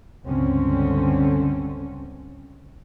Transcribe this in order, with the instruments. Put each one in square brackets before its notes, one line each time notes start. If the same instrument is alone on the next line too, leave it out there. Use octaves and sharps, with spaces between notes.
[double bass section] C#2 G2 D3 C4 C#4